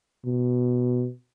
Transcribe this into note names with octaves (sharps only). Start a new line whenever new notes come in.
B2